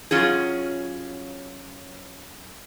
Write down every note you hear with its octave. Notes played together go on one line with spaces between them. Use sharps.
F#2 C#4 F4 G#4